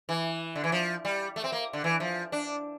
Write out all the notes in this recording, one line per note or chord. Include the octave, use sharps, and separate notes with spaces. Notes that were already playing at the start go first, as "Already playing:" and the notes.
E3
D3
E3
F3
G3
A3
C4
A#3
D3
E3
F3
D4